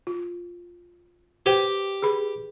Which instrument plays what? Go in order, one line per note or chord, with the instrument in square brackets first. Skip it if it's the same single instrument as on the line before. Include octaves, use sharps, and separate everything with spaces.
[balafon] F4
[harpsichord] G4 [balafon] B4 C5 G5
[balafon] G#4 B4 B5